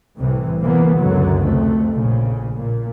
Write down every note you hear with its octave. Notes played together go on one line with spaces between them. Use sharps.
C2 A2 C3 E3
F1 B1 D3 E3 A#3 B3
C#2 F#2 B2 D3 F#3
F2 C3 A3
A#1 C#3
A#2